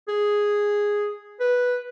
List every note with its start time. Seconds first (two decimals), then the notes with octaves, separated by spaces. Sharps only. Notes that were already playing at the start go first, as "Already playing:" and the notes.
0.08 G#4
1.40 B4